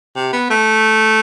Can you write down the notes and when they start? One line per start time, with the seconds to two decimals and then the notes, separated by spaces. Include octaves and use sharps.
0.16 C3
0.33 B3
0.50 A3